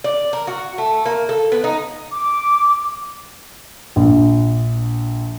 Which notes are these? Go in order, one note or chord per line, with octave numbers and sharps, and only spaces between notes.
D5
A#4
F#4
A3
A#3
A4
B3
D#4
D6
A#1